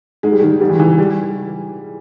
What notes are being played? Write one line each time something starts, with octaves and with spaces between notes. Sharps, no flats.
G#2 G#3
G3
D#3 G#3
G#2 G3
E3
E3
G3